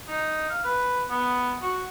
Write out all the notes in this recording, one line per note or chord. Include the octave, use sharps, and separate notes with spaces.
D#4
F5
B4
B3
F#4